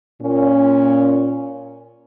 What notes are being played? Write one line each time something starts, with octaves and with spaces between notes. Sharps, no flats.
A#2 C#4